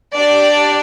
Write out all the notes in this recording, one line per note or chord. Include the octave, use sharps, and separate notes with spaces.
D4 G4 D5